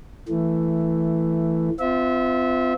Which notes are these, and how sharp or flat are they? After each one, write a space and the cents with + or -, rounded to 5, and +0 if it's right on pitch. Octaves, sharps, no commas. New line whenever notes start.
E3 +5 A3 +10
C4 -35 F4 +0 E5 -25